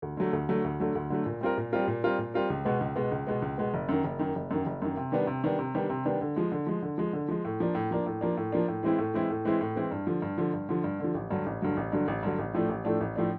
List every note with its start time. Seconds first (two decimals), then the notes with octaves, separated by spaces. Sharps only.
0.02 D2
0.17 D3 F#3 A3
0.33 D2
0.49 D3 F#3 A3
0.64 D2
0.80 D3 F#3 A3
0.95 D2
1.10 D3 F#3 A3
1.26 A#2
1.41 G3 C4 F4 A#4
1.57 A#2
1.72 G3 C4 F4 A#4
1.88 A#2
2.04 G3 C4 F4 A#4
2.19 A#2
2.34 G3 C4 F4 A#4
2.50 C#2
2.65 B2 G#3 B3
2.81 C#2
2.96 B2 G#3 B3
3.11 C#2
3.27 B2 G#3 B3
3.42 C#2
3.58 B2 G#3 B3
3.74 F#1
3.89 F#2 D#3
4.04 F#1
4.19 F#2 D#3
4.35 F#1
4.51 F#2 D#3
4.66 F#1
4.82 F#2 D#3
4.97 C3
5.12 D#3 G3 B3 D4
5.27 C3
5.44 D#3 G3 B3 D4
5.59 C3
5.75 D#3 G3 B3 D4
5.90 C3
6.05 D#3 G3 B3 D4
6.21 D3
6.36 F3 G#3
6.52 D3
6.67 F3 G#3
6.82 D3
6.98 F3 G#3
7.13 D3
7.28 F3 G#3
7.45 A2
7.60 F3 A#3 D4
7.75 A2
7.91 F3 A#3 D4
8.06 A2
8.21 F3 A#3 D4
8.37 A2
8.52 F3 A#3 D4
8.68 A2
8.83 E3 G#3 C4 E4
8.99 A2
9.14 E3 G#3 C4 E4
9.30 A2
9.45 E3 G#3 C4 E4
9.61 A2
9.76 E3 G#3 C4 E4
9.91 G2
10.07 D3 F3
10.22 G2
10.38 D3 F3
10.53 G2
10.69 D3 F3
10.84 G2
11.00 D3 F3
11.15 A1
11.30 G2 D3 F#3
11.46 A1
11.62 G2 D3 F#3
11.77 A1
11.92 G2 D3 F#3
12.08 A1
12.23 G2 D3 F#3
12.39 A1
12.54 A2 F3 A3 D4
12.69 A1
12.85 A2 F3 A3 D4
13.01 A1
13.16 A2 F3 A3 D4